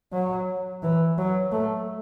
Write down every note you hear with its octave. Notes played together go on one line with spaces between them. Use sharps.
F#3
E3
F#3
A3